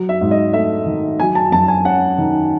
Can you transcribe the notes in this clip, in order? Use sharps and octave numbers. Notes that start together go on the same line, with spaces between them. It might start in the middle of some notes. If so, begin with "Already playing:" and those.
Already playing: F#3
E5
G#2
D#5
A3 E5
D#3
F#3 G#5
A5
F#2 A5
G#5
C#4 F#5
D#3